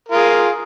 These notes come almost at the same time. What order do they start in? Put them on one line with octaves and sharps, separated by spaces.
A#4 F4 G#4